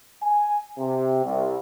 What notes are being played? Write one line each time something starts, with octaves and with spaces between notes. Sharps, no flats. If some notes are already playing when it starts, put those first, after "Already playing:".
G#5
C3
C2